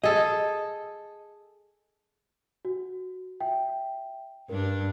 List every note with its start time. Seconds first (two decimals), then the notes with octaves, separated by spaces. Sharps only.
0.04 G#4 A4 D#5
2.65 F#4
3.41 E5 G5
4.49 G2 D4 A#4